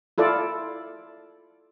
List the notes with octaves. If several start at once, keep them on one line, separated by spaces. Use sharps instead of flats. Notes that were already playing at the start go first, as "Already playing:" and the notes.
E4 F4 A4 D5